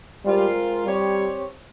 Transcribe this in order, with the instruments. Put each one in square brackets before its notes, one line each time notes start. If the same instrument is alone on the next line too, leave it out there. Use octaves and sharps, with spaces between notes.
[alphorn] G3 [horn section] G#3 C4 F4 A#4
[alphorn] G3 [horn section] C4 G4 C#5